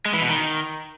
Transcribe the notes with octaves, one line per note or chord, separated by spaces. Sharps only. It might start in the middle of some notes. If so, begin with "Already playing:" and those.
G#3
E3
B2
D#3